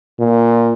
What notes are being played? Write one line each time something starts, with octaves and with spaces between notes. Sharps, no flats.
A#2